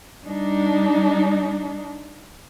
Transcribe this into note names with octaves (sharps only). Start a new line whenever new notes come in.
G3 D4 D#4